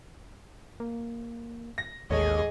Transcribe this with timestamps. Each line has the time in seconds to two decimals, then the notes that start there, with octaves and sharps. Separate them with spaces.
0.80 A#3
1.78 A#6
2.10 A1 D#2 G#2 G#4 A4 C#5 D#5